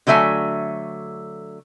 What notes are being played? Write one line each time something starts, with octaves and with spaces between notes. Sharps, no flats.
D3 F#3 A3 E5 G#5